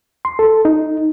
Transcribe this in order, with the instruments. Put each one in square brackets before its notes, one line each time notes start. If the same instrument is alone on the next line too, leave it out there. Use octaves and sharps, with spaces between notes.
[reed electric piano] C6
A4
D#4